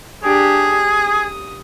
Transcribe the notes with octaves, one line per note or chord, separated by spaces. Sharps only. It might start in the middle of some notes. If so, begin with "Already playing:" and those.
D4 G4 G#4
D#6